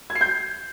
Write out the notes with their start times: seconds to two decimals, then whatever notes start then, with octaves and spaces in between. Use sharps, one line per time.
0.10 G#6
0.15 C7
0.21 G6